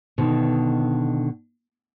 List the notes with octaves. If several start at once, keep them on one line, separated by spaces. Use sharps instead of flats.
B2 D3 D#3